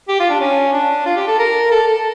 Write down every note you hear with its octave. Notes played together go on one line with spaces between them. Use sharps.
G4
F4
D4
C#4
D4
F4
G4
A4
A#4
A4
A4